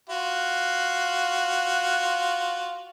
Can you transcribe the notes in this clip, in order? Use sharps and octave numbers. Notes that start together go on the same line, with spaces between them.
F4 F#4